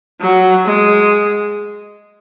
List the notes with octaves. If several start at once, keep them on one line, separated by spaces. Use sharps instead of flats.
F#3
G#3